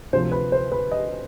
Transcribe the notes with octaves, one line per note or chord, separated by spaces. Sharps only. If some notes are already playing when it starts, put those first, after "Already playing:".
D2 C3 F3 C5
B4
C5
B4
D#5